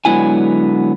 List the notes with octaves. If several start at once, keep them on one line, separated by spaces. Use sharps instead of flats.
D3 F#3 G#3 B3 E4 G#5